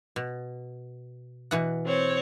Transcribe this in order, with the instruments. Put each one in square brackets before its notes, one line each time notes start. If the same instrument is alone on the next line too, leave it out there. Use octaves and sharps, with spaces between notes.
[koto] B2
B2 E3 F#5
[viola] C4 C#5